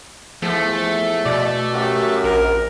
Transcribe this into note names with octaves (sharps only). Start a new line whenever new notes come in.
E2 F3 A3
B2 D5
F#2 G4
A#1 A#4